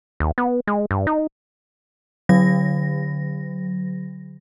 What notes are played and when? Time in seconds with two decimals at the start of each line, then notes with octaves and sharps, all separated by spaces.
0.20 D#2
0.38 B3
0.67 G#3
0.91 G2
1.07 D#4
2.29 D3 F#3 A#6